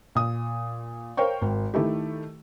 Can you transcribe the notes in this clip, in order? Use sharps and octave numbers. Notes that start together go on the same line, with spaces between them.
A#2 D#6
A#4 C5 C#5 F5 G5 C#6
G#1
D#3 A3 E4 G4